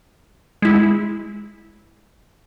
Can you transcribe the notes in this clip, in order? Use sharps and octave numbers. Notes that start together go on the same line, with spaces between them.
G#3 E4